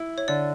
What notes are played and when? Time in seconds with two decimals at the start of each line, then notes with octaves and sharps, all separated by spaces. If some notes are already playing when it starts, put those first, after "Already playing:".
Already playing: E4
0.18 C#5
0.28 D3 D5